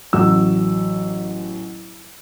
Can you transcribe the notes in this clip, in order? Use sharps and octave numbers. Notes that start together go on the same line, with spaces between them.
A1 F#3 E6